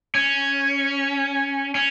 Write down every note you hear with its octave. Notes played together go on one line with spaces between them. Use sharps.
C#4
C#4